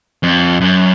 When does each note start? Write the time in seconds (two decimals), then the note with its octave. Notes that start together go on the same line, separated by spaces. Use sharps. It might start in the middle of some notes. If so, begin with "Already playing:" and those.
0.23 F2
0.61 F#2